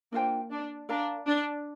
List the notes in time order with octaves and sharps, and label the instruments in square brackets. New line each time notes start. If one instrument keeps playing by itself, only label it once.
[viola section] A#3 [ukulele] D4 F4 C5 G5
[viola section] D4
[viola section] D4 [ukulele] A#4 F5 A#5
[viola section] D4